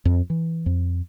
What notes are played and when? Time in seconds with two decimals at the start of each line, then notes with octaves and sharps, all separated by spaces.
0.05 F2
0.30 E3
0.66 F2